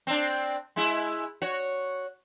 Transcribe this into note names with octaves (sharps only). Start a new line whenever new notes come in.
C4 D4
G#3 E4
F#4 C#5